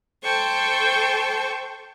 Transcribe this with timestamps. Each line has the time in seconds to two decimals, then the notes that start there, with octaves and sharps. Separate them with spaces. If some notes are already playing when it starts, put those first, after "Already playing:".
0.23 A4 C5 G5 A5 C#6